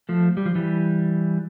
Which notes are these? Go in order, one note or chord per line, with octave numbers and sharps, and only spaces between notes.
F3 A3
G3
F3
E3 G3